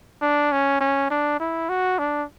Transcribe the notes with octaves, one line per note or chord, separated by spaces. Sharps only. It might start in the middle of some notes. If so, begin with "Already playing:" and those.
D4
C#4
C#4
D4
E4
F#4
D4